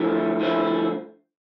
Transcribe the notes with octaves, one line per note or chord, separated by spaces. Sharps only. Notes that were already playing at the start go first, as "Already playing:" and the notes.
Already playing: D3 F3 A3 E4
D3 F3 A3 E4